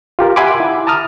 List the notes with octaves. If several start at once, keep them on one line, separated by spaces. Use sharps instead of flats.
F4 G4 A#4
E5 F#5 G#5 B5 C6 D6
E4
A5 A#5 D#6 F6